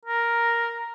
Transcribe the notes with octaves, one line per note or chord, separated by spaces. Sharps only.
A#4